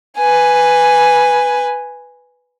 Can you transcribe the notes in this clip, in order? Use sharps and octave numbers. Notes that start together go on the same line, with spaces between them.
B4 G#5